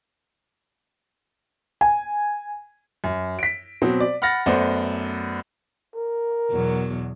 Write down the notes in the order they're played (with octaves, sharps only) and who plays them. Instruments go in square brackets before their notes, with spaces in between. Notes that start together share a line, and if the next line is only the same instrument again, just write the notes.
[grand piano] G#5
F#2
B6 D7
B2 F#3 C4
D5
F#5 B5 F6 A6 A#6
F#2 A3 B3 C5 D5
[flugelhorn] A#4
[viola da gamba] E2 B2 F#3